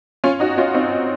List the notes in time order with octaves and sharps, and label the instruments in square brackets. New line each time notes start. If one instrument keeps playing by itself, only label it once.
[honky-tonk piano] C#4 F4
D#4 F#4
C#4 F4
C4 D#4